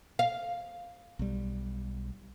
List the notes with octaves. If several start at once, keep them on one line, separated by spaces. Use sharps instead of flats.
F5
B1 G3